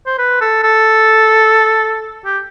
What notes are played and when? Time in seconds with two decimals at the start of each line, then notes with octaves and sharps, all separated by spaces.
0.06 C5
0.18 B4
0.41 A4
0.64 A4
2.25 G4